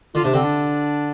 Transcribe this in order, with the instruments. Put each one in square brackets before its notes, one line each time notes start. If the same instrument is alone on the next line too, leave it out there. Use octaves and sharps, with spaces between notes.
[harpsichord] D3 [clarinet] F4
[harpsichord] C3 [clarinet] D4
[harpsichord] D3 [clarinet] C4
[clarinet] D4